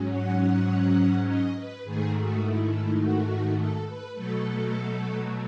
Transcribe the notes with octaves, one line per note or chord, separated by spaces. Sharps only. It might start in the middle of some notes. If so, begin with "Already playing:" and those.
Already playing: G#2 F#3 C#4
F#5
D#5
B4
G#2 D#3 A3 G#4
F#4
E4
F#4
A4
B4
B2 F#3 A3 A4